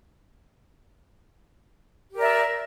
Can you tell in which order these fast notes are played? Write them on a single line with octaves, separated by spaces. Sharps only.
G4 A#4 D5 E5